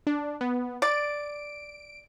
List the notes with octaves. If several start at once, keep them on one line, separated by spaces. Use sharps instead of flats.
D4
B3
D5 D7